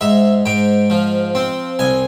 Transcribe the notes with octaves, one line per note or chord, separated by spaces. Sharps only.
G#2 E5
G#2 G5
F3
C4
C2 G#5